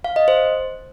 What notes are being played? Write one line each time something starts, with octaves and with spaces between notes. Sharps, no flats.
F5
D#5
C5